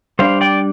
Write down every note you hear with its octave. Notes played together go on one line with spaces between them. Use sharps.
G3 D4 C5 F5
D5 G5